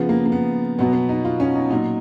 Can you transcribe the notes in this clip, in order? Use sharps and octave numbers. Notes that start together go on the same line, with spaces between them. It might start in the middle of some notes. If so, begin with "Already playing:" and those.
Already playing: C#3 F3 B3
A#3
A#3
B3
B2 F#3 B3
B3
D#4
F4
C#4
D#4
A#2 F#3 D#4